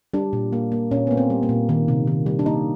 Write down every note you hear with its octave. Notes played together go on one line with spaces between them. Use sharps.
G3 D4
A#2
A#3
A#3
A#2 C#4
A#3 B3
C4
G3
A#3
A#2
D#3
C3
D#3
G3
D4
A#3 D#4